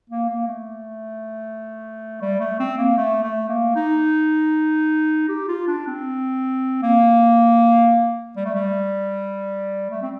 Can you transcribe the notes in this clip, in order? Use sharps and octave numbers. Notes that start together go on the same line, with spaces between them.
A#3
A#3
A3
G3
A3
C4
A#3
A3
A3
A#3
D#4
G4
F4
D4
C4
A#3
G3
A3
G3
A3
C4